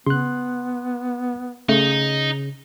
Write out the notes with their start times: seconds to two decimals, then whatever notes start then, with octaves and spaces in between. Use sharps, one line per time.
0.06 C#3 B3 C6 F#6
1.69 C#3 A3 D#4